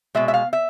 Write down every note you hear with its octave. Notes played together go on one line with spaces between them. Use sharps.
B2 G#3 E5
E5
F5
E5